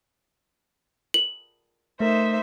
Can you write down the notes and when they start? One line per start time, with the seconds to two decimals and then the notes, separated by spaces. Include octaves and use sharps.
1.14 F#7
2.00 A3 D#4 A#4 C5 E5